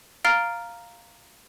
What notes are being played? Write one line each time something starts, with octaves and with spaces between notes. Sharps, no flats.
F5 A#5 F6 A6 D7 G7